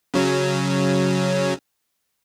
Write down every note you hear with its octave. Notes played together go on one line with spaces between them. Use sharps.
C#3 F#3 C#4